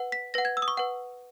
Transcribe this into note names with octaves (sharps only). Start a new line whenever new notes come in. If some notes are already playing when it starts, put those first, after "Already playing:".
Already playing: B4 F#5
B6
B4 F#5 A#6
G#6
E6
D#6
C#6
B4 F#5